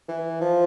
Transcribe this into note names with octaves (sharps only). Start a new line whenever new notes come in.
E3
F3